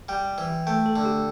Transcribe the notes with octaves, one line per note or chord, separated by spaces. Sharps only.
G3 G5
E3
A3 G5
A4
D3
G4